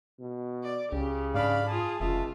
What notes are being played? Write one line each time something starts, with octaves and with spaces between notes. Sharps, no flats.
B2
D5
C#2 C#3 G4
G#2 D4 D5 F5 B5
F4 G#4 A5
F1 C#2 F4 E5 A5